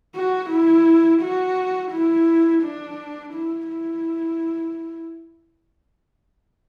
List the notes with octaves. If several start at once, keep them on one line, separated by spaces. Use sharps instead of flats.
F#4
E4
F#4
E4
D4
E4
E4